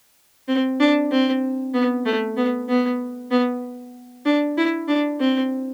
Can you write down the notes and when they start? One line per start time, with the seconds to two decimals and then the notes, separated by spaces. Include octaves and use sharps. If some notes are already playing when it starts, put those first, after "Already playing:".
0.48 C4
0.80 D4
1.11 C4
1.74 B3
2.05 A3
2.37 B3
2.68 B3
3.31 B3
4.25 D4
4.57 E4
4.88 D4
5.20 C4